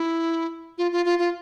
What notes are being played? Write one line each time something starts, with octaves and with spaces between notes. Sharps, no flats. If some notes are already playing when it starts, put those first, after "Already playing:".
Already playing: E4
F4
F4
F4
F4